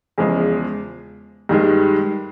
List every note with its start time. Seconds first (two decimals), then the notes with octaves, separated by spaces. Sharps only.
0.18 E2 C#3 F3 G#3
1.49 G2 D#3 G#3